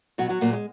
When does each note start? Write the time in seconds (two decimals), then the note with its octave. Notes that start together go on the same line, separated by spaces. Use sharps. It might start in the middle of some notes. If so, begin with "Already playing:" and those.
0.18 B2 F#3 F#4
0.29 F#3 F#4
0.41 A#2 F#3 A#3
0.53 G#3